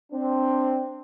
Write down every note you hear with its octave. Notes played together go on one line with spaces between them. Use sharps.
C4 D4